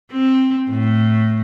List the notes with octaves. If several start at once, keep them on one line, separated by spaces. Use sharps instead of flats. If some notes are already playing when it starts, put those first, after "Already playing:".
C4
A2